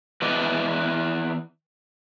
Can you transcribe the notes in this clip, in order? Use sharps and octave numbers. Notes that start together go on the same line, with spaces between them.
E3 B3 B4 D5 D#5